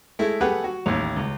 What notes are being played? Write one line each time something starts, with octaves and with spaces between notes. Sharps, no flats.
G#3 A3 E4
A3 G4 G#4 B4 F#5 F#6
F#4
A1 D#2
C#2